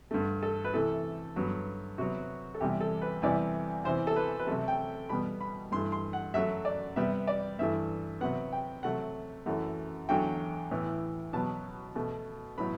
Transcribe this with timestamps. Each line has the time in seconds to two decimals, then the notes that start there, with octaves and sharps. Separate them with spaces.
0.11 G2 D3 A3
0.43 A4
0.64 B4
0.73 C3 E3 A3 A4
1.36 G2 F#3 B3
1.98 C3 F#3 B3 F#4
2.54 A4
2.61 E2 C3 G3 G4
2.81 A4
3.02 B4
3.22 E2 C3 E3 G3 B3 D5
3.84 E2 C3 E3 C5
4.07 A4
4.16 B4
4.39 B4
4.47 C3 F#3 A3 A4
4.68 G5
5.09 B2 G3 B3 B5
5.41 B5
5.72 G2 E3 A3 C6
5.92 C6
6.13 F#5
6.34 F#2 F#3 A3 E5
6.65 D5
6.96 C3 G3 B3 E5
7.27 D5
7.59 G2 E3 A3 E5
8.21 C3 F#3 B3 F#5
8.52 G5
8.83 C3 F#3 A3 F#5
9.46 F#2 E3 A3
10.09 E2 D3 F#3 A3 G5
10.71 A2 E3 B3
11.33 B2 F#3 B3 A5
11.95 B2 A3
12.58 A2 F#3 B3 B5